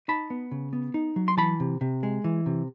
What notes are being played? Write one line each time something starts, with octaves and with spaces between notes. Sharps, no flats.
D#4 A5 B5
B3
C#3
B3
D#4
F#3
C6
E3 A5 B5
C3
C3
G#3
E3
C3